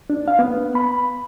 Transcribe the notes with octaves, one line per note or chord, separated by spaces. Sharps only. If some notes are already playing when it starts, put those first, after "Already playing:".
D4
F5
B3
B5